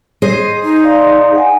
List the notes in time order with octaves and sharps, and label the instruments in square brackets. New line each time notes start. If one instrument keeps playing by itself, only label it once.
[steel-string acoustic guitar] G#4 C5 D#5
[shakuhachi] D#4
[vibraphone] D5 F5 C6
F#5 G#5